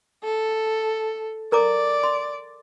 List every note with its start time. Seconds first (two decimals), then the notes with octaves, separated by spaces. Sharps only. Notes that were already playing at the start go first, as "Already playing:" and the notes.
0.24 A4
1.52 A#4 D5 A#5 D6
2.03 C6